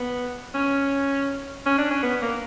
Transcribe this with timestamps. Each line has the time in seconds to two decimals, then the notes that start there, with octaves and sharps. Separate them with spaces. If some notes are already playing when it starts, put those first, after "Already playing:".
Already playing: B3
0.55 C#4
1.66 C#4
1.78 D4
1.91 C#4
2.03 B3
2.22 A#3